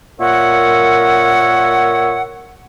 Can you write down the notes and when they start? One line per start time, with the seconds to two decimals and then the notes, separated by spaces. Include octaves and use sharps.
0.20 A#2 A#4 C#5 E5 F#5